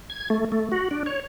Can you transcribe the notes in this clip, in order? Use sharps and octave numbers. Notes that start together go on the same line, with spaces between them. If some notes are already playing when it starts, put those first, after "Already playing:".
G#6
A3
A3
F#4
D4
C#5